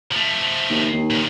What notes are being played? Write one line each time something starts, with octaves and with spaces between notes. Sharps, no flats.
F3 A3
D#2
D#2
A#2 C#3